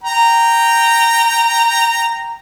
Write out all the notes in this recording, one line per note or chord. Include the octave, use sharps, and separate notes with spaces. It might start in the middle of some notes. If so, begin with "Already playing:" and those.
G5 A#5